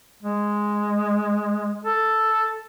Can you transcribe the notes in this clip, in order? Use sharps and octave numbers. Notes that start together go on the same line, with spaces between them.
G#3
A4